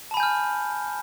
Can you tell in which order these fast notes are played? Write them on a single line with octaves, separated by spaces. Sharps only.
A5 B5 G#5 G6 F6